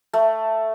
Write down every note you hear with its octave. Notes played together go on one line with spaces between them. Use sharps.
A3